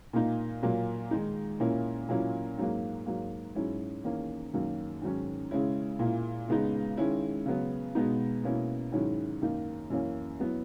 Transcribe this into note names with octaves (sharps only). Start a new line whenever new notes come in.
A#2 A#3 D#4
A#2 F#3 A#3
D#3 G#3 D#4
A#2 A#3 C#4 E4
A#2 F#3 A#3 C#4 E4
G#2 F#3 A#3
G#2 F#3 A#3
G#2 F#3 C#4 E4
E2 D#3 A#3 C#4
F#2 D#3 F#3 A#3
G#2 D#3 F#3 C#4
C#3 G#3 C#4 E4
A#2 A#3 E4
C#3 G#3 B3 D#4
D#3 G#3 C#4 E4
C#3 F#3 B3
B2 G#3 B3 D#4
B2 A#3 C#4 E4
G#2 D#3 F#3 C#4 E4
F#2 D#3 A#3 D#4
F#2 E3 A#3 C#4 E4
F#3 B3 E4